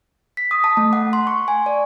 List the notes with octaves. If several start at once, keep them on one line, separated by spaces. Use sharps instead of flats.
B6
D#6
A5
A3
F#5
C6
C#6
G#5
D5